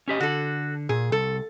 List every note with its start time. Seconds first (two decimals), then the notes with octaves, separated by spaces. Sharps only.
0.08 C#4 G4 D#5
0.20 D3 F#4 A4
0.89 A#2 G#4
1.12 C2 A4